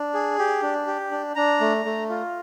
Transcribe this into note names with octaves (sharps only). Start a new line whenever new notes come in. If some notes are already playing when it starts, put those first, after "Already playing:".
Already playing: D4
G#4
G4
D4
G4
D4
D4 A#5
A3
A3
F4